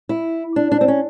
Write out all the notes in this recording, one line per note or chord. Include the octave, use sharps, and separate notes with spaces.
E4
D4
D4
C4
C#4